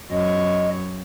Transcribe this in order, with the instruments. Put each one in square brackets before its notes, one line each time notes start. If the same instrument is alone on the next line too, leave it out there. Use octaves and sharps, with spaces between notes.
[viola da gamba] F#2 C#5 [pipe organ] D#5